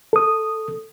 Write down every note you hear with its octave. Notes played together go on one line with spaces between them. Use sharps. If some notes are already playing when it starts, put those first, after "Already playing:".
A4 D#6